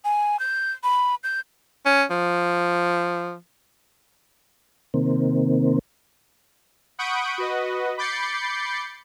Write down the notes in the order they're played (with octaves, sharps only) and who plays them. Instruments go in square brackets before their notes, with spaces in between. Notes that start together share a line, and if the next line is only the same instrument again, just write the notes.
[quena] G#5
G6
B5
G6
[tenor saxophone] C#4
F3
[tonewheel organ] C3 D#3 A#3 C4
[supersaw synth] F#5 B5 C#6 D#6 G6 D7
F#4 B4 D#5
B5 D6 G6 A6 C7 C#7